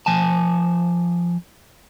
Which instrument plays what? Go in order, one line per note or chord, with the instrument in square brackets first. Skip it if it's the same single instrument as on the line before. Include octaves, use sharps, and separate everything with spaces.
[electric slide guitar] F3 G#5 A5